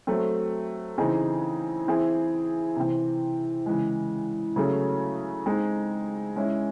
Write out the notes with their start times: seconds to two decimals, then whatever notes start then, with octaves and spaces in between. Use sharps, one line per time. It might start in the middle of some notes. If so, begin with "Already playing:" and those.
0.07 F#3 A3 C4
0.98 C#3 E3 C4 D#4 G#4
1.86 E3 C4 E4 G#4
2.76 C3 E3 C4
3.66 C#3 E3 G#3
4.56 C#3 F#3 A3 C#4 G#4
5.46 G#3 C4 D#4 G#4
6.36 G#3 C#4 E4